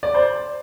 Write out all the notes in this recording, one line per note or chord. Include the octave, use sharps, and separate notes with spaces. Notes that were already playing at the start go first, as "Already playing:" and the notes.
D5
C5